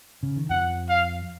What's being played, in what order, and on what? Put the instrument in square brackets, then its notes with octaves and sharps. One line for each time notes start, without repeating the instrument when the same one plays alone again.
[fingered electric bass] C#3
D#3
[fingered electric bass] F2 F3 [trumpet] F#5
[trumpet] F5